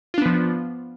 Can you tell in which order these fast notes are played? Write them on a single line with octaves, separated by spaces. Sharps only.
F4 D4 B3 F3